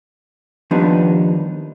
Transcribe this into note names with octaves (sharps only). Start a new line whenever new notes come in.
D#2 F3 G3 B3 D4 D#4